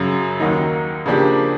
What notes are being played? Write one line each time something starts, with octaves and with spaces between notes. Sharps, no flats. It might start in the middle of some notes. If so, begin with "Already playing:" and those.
Already playing: F#2 C#3 F#3
D#2 D#3 F#3 A#3 D#4
C#3 F3 A#3 D4 G4